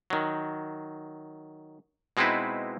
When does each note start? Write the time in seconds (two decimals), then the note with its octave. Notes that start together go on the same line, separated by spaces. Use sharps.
0.10 D#3 F#3
2.17 B2 G#3 C4 D#4 E4 B4